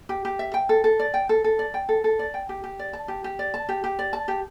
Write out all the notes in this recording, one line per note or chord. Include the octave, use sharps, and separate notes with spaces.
G4
G4
E5
G5
A4
A4
D5
G5
A4
A4
D5
G5
A4
A4
D5
G5
G4
G4
D5
A5
G4
G4
D5
A5
G4
G4
D5
A5
G4